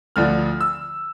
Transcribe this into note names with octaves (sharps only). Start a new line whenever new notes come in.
D2 D3 F3 F6
E6